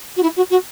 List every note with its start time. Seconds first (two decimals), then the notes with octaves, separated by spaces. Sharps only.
0.16 F#4
0.22 E4
0.36 F#4
0.50 F#4